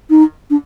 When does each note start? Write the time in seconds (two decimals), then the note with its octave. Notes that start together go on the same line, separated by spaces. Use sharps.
0.09 D#4
0.50 D4